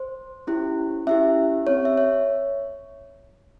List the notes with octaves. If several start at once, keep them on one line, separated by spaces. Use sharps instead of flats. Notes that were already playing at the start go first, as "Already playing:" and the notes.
Already playing: C5
C#4 E4 G4
C#4 E4 G4 E5
C4 G4 C#5
E5
C#5